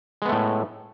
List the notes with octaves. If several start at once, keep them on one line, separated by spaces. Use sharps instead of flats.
A2 G#3 A3 B3